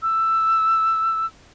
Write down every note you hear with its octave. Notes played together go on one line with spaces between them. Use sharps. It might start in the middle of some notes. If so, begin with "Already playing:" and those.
E6